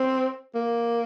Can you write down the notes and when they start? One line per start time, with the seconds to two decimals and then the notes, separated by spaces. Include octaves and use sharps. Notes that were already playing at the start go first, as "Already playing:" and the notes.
Already playing: C4
0.55 A#3